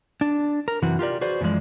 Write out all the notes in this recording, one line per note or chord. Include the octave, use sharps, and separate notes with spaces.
D4
A#4
F#2 C3 E3 F#4
F4 G4 A#4 D5
F#4 G#4 B4 C5 D5
F#2 A2 E3 F3 G#3 D5